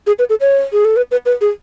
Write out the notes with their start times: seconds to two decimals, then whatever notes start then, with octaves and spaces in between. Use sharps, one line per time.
0.07 G#4
0.19 B4
0.30 A4
0.41 C#5
0.73 G#4
0.85 A4
0.97 B4
1.11 B4
1.26 B4
1.41 G#4